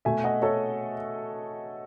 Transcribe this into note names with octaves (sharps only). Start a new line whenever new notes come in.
B2 A3 E5 G#5
D#5 F#5
A4 C#5